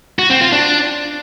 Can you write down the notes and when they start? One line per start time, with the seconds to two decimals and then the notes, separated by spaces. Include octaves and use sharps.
0.19 F#4
0.30 C4
0.41 F4
0.52 D4